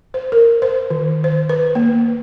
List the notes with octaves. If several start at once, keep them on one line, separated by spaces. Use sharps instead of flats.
C5
A#4
C5
D#3
C5
B4
A#3